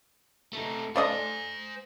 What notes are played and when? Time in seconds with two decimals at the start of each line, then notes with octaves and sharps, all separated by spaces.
0.53 A3 D#4
0.96 A3 C5 D5 D#5 G#5